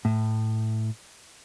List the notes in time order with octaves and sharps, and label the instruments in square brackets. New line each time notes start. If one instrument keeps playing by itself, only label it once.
[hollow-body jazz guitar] A2